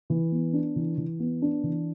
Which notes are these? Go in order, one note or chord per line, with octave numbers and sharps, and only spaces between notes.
E3
B3
D4
E3
E3
B3
D4
E3